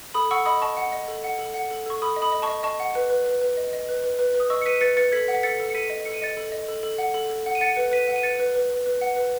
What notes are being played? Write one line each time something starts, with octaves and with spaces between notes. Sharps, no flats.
A4 B5 D#6
F#5 C#6 E6
D#5 B5 D#6
D#5 A5 C#6
F#5
D#5
A4
F#5
A4
F#5
A4
A4 C#6
A4 B5 D#6
D#5
B5 D#6
D#5
A5 C#6
D#5
D#5 A5 C#6
F#5
B4
B4
B4
B4
D#5
D#5
B4
B4
B4
B4
D#6
D#5 C#6 E6
C#7
B4 B6 D#7
B4 A6 C#7
B4 A6 C#7
A4 G#6 B6
F#5
B6
A4 A6 C#7
A4
C#7
A4 B6 D#7
D#5
A4 C#7
D#7
D#5 A6 C#7
A4
D#5
A4
A4
F#5
A4
A4
F#5
D#7
F#5 A6 C#7
B4
B4 B6 D#7
F#5
D#7
B4 A6 C#7
B4
B4
B4
B4
F#5
B4